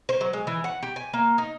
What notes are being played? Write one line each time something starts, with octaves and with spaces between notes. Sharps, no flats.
C5
F#3
G#3
E3
F#5
G4
G#5
A#3
D#4